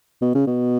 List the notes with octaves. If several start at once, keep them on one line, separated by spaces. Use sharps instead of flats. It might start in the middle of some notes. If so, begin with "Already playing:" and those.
B2
C#3
B2